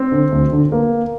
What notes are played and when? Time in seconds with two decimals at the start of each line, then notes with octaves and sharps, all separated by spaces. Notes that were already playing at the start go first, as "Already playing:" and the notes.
Already playing: C4
0.12 D3
0.32 D2
0.52 D3
0.72 A#3